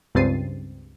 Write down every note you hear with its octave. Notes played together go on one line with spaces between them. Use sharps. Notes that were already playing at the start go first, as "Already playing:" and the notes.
C#2 G2 C4 A6 C7 D#7